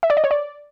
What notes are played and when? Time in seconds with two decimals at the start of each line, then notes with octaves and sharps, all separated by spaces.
0.03 E5
0.10 D5
0.17 D#5
0.24 C#5
0.31 D5